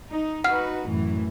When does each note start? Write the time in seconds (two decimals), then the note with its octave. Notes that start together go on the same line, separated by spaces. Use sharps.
0.11 D#4
0.44 D#4 F#4 B4 F#5 F6
0.87 F#2 A2 E3